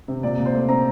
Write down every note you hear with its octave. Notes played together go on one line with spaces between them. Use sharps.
C3
A#2 D5
A#2
C5
A3
C4 A#5